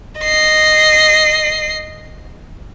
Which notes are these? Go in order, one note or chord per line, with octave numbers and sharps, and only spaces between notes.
D#5 C7